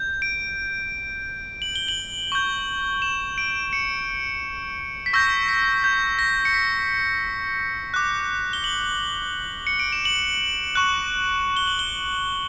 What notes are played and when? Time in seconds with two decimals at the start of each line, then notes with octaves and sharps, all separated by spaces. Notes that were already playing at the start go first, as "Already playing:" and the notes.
Already playing: G6
0.22 D7
1.62 F#7
1.76 G7
1.88 F#7
2.32 C#6 G6
3.02 E7
3.38 D7
3.73 C#7
5.06 B6
5.13 C#6 E6 G6 A#6
5.48 B6
5.84 G6
6.19 A#6
6.45 C#7
6.54 B6
7.94 D6 F#6
8.53 G7
8.64 F#7
9.67 C#7
9.80 D7
9.93 E7
10.05 F#7
10.75 C#6 F#6
11.57 G7
11.67 F#7
11.79 G7